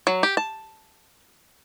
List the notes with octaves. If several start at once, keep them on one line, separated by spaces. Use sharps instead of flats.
F#3
G4
A5